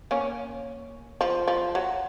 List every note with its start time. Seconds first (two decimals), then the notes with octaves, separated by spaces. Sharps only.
0.11 A#3 C#4
1.21 F3
1.48 F3
1.75 F#3